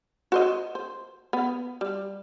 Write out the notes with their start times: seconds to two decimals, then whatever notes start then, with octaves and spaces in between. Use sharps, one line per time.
0.32 F#4 C5 D#5
0.75 C5
1.33 B3
1.81 G3